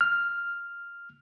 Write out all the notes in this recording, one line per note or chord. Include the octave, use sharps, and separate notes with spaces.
F6